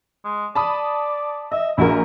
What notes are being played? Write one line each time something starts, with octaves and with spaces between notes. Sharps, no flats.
G#3
D5 A5 B5 D#6
D#5 E5
A#1 E4 F#4 A#4